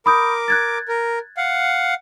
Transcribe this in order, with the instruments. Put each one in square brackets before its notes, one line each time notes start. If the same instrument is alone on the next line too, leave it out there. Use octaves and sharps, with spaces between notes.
[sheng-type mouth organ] A#4 D6 [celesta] B5 D#6 G6
[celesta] F#6 G#6 A6
[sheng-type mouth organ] A#4
F5 F#5